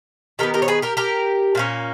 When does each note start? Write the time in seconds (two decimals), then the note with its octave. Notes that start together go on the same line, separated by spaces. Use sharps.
0.39 D#3 G#3 B3 G4 A#4
0.54 G4 A#4
0.62 C#5
0.68 G#4 B4
0.82 G4 A#4
0.97 G4 A#4
1.55 A#2 A#3 C#4